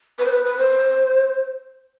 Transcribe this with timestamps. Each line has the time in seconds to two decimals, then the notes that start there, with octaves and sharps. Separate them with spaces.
0.19 B4
0.25 C5
0.31 B4
0.44 B4
0.57 C5